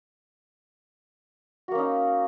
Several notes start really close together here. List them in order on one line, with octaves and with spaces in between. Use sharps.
F#4 A#3 C#4 D#4